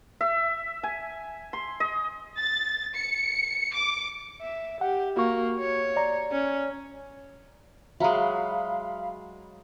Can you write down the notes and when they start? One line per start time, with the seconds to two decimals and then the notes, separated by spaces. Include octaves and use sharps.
0.21 E5
0.83 G#5
1.53 C6
1.80 D#5
2.38 A6
2.96 C#7
3.74 D6
4.41 E5
4.81 G4 F#5
5.17 A#3 F#4 C#6
5.60 C#5
5.96 D5 A#5
6.31 C#4
8.00 F#3 G#3 E5 F5 A#5 B5